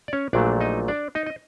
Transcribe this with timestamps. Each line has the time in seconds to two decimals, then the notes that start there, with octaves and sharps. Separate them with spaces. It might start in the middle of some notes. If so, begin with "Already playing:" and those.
0.08 D5
0.13 C#4 C#5
0.33 A#1 A#2 F#3 A3 D4 D5
0.61 D#4 D#5
0.88 D4 D5
1.15 D#4 D#5
1.26 D#5